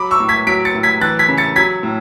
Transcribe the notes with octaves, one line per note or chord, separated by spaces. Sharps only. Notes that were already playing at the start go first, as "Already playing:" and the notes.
Already playing: F#3 B5 D6
C#6 E6
A2
G#6 B6
F#3 B6 D7
A6 C#7
A2
G#6 B6
E3 F#6 A6
G#6 B6
C#3
A6 C#7
F#3 G#6 B6
A2